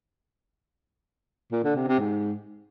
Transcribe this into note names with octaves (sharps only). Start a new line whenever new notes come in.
A#2
D3
C3
C3
G#2